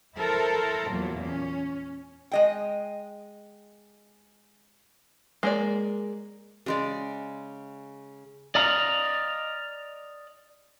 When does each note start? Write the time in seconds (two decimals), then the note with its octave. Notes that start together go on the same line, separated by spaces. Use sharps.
0.17 E4 A4 A#4 C5
0.91 E2 A#2 F#3
1.25 C#4
2.32 G#3 D#5 G5
5.43 G#3 A#3 D5
6.66 C#3 G#3 D5
8.55 D5 D#5 F5 A#5